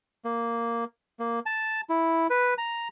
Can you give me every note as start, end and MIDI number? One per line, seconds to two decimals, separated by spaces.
0.25 0.84 58
1.19 1.40 58
1.46 1.81 81
1.89 2.27 64
2.30 2.54 71
2.58 2.88 82